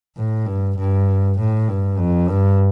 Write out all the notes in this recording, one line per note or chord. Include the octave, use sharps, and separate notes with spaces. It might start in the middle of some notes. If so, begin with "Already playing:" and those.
A2
G2
G2
A2
G2
F2
G2